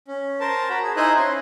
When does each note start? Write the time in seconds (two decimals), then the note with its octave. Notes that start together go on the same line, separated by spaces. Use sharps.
0.08 C#4
0.40 A#4 C5 A5
0.69 F#4 A#5 B5
0.83 G#4
0.97 D#4 E4 C5 G#5 A#5 F#6
1.17 C#4 C6